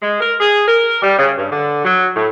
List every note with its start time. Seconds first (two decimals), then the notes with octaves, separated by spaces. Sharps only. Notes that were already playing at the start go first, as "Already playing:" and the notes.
0.02 G#3
0.20 A#4
0.40 G#4
0.68 A#4
1.02 G3
1.18 C#3
1.38 G2
1.51 D3
1.85 F#3
2.16 A2